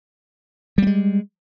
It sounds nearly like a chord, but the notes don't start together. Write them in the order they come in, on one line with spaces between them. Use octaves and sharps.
G3 A#3 G#3